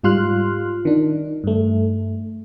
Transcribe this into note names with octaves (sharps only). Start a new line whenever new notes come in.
G#2 G3 F4 C6 F6 F#6
D#3 D4
G2 A3